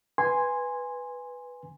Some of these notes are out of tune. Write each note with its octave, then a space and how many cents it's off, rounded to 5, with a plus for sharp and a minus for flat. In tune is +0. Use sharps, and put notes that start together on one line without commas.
B4 +0 G#5 -10 C6 +0